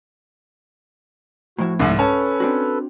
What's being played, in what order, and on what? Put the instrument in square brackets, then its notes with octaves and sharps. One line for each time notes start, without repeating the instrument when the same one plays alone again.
[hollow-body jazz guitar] A2 F3 E4 [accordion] F#4
[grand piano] C2 G#2 [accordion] E5
[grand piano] C#4 [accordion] A4 B4 [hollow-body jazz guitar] A5
[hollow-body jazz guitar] C4 D4 F#4